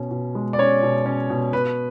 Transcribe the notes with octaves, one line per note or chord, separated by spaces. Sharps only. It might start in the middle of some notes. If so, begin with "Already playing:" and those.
Already playing: B2 C#4
B2
G#3
D5
C#4 C#5
B2
C#4
B2
B2 B4